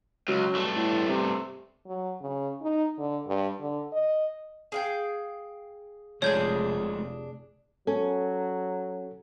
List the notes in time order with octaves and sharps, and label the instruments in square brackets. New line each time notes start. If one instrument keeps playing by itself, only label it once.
[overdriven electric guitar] C#2 [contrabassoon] F#3
[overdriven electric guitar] G2 A3
[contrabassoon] A2
C3
[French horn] F#3
C#3
D#4
D3
G2
D3
D#5
[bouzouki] G#4 F5 G5
[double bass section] F1 [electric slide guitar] F3 G#3 A3 [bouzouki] D4 G#4 [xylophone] C#5 G6
[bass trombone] F#3 [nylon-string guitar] C#4 [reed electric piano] A4